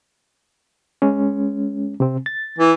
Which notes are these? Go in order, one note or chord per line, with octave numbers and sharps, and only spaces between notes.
G#3 C#4
C3 C4
A6
E3